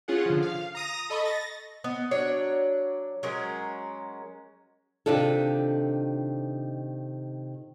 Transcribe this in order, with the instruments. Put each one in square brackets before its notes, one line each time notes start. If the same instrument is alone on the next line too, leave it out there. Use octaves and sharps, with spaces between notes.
[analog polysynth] C#4 F4 G#4 F#5
D3 F3
F5
A#5 D#6 A#6
A4 D#5 B5 C#6
A6 A#6
[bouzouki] B3 D#5
F#3 D4 C#5
F#3 G#3 C#4 A#4
[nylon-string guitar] C3 D#3 D4 F4 A4